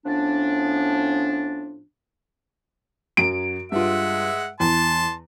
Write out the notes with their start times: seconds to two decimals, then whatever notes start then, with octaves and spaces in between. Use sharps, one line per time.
0.06 A2 F3 B3 C#4 D4
3.17 F#2 F#3 D7
3.72 G2 G#3 F4 E5 F#5
4.60 E2 A5 C6